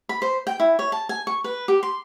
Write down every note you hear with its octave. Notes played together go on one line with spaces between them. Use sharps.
B5
C5
G5
E4
C#5
A5
G#5
C#6
B4
G4
C6